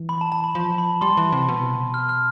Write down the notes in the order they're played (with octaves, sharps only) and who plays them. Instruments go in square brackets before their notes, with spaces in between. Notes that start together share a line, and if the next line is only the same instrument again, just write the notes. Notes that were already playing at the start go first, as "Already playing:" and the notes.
Already playing: [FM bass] E3
[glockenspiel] B5
A5
A5
B5
[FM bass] F3 [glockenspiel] A5
[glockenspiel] B5
[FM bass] G3 [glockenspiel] C6
[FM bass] E3
C3
B2
[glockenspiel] F6
F6